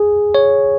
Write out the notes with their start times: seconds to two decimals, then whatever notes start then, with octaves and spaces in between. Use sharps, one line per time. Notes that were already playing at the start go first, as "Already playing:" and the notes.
Already playing: G#4
0.35 C#5